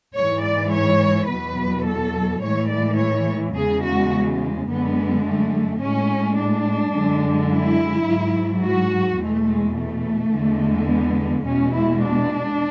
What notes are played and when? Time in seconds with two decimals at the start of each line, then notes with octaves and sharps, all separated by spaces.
0.16 G#2 E3 G#3 C#5
0.44 D5
0.73 C#5
1.30 E2 B2 F#3 B4
1.86 A4
2.43 A2 E3 G#3 C#5
2.70 D5
2.98 C#5
3.55 E2 C#3 G#3 G#4
3.83 F#4
4.67 F#2 D3 G#3 B3
5.25 A3
5.81 A2 G#3 C#4
6.38 D4
6.93 F#2 D3 G#3
7.50 E4
8.06 G#2 F#3
8.62 F#4
9.19 E2 B2 G#3 A3
9.47 G#3
9.75 A3
10.32 E2 D3 G#3
10.89 B3
11.46 E2 B2 G#3 C#4
11.73 E4
12.02 D4